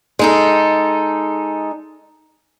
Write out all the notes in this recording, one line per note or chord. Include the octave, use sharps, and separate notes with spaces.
G#3 D#4 A4